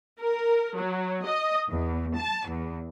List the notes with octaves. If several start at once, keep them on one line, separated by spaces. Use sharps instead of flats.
A#4
F#3
D#5
E2
A5
E2